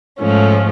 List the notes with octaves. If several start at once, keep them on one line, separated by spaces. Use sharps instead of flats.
G#2 F3 A3 C#4